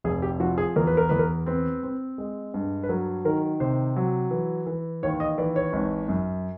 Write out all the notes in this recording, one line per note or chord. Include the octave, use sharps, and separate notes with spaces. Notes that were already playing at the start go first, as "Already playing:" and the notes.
F1 G#4
G4
F3 F#4
G#4
E2 A#4
B4
A#4
E2 B4
A#4
C4 B4
C4
G#3
G2
B4
F#3 A#4
D#3 A#4
C3 C5
F#3
E3
E3
D#2 C#5
D#5
E3 D5
C#5
G#1
F#2